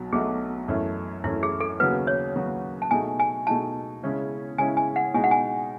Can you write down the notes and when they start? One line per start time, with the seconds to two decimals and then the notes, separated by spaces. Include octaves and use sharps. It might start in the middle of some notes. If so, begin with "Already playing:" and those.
Already playing: B1 B2 F#3
0.12 B1 B2 F#3 A3 G#4
0.68 F#2 E3 A3 C#4
1.24 F#2 E3 A3 C#4 E4
1.43 G#4
1.61 A4
1.79 D#2 C#3 F#3 B3 F#4 B4
2.07 C#5
2.35 D#2 C#3 F#3 B3 F#4
2.82 A5
2.91 B2 A3 D#4 G#4 G#5
3.20 G#5
3.47 B2 A3 D#4 G#4 A5
4.03 C#3 G#3 C#4 E4
4.58 C#3 G#3 C#4 E4 G#5
4.77 G#5
4.96 F#5
5.14 B2 G#3 D#4 G#5
5.24 F#5
5.31 G#5